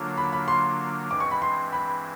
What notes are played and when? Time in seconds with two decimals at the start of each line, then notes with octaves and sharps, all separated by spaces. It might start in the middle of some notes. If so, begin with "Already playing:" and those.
Already playing: D3 F#3 A#3 D4 F4
0.17 B5
0.33 B5
0.48 C6
1.10 G2 E3 G#3 C4 D6
1.20 C#6
1.31 B5
1.42 C6
1.73 B5